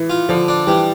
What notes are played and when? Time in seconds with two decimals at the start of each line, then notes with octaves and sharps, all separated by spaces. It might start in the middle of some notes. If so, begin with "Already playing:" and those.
Already playing: E3
0.10 F4
0.29 D3 F3
0.48 D4
0.67 E3 G3